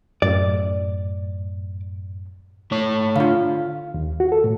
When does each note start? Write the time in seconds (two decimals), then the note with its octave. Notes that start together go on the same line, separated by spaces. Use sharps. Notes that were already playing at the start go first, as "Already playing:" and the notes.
0.22 F#2 A2 D5
2.72 A3 C#5
3.16 D3 F4 F5
3.94 D#2
4.20 F#4
4.32 A4
4.44 A2